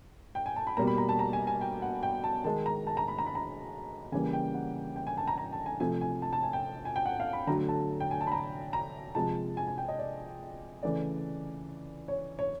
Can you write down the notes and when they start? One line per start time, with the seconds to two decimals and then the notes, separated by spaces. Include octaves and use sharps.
0.35 G5
0.46 G#5
0.56 A5
0.67 B5
0.77 B2 G3 A#3 A#5
0.87 B5
0.98 A#5
1.09 A5
1.19 A#5
1.33 G#5
1.47 G#5
1.61 G5
1.82 F#5
2.03 G5
2.24 A5
2.44 D#3 G#3 A5
2.66 A#5
2.87 A5
2.97 A#5
3.08 B5
3.19 A#5
3.26 B5
3.35 A#5
4.12 C#3 E3 G3 A#3 G#5
4.33 G5
4.54 F#5
4.96 G5
5.07 G#5
5.18 A5
5.28 A#5
5.38 A#5
5.53 A5
5.66 G#5
5.80 C3 F3 A3 G#5
6.01 G#5
6.22 A5
6.33 A5
6.43 G#5
6.53 G5
6.85 G#5
6.96 G5
7.06 F#5
7.20 F5
7.33 B5
7.47 D3 F#3 A3 A#5
7.68 A5
8.00 G5
8.11 G#5
8.21 A5
8.27 B5
8.32 A#5
8.73 A#5
9.15 C3 F3 G#3 A5
9.57 G#5
9.67 G#5
9.78 G5
9.88 D#5
9.99 D5
10.83 C#3 E3 A3 D5
12.08 C#5
12.39 C#5